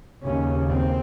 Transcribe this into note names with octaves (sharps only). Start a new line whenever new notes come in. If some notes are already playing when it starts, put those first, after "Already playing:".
D#2 C#3 C#4
C4